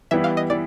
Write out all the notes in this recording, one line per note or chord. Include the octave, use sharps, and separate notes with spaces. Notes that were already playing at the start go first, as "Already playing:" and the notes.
E3 G3 B3 E4 E5
F5
D#5
E3 D5